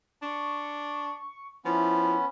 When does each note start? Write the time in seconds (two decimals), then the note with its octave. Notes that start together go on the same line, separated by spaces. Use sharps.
0.22 D4 C#6
1.65 F3 B3 C#4 E4